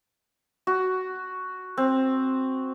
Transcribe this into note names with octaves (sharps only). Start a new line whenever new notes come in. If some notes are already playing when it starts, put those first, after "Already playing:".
F#4
C4